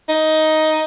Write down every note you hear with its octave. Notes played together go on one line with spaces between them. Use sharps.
D#4